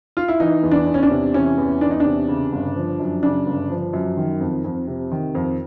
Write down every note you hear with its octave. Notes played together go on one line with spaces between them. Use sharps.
F4
E4
E3 D#4
E2
D4
E2
C#4
D4
C3
E3 C#4
E2
E2 D4
D#4
D4
C3
C#3
G1
F3
F#2
C#3 D4
G1
F3
F#2
D#3
F2
F2
C3
D#3
F2